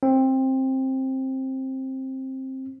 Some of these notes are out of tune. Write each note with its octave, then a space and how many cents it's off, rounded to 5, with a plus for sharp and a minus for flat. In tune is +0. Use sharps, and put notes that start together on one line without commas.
C4 +15